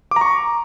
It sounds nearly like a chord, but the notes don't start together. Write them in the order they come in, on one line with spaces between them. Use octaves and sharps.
D6 A#5 C#6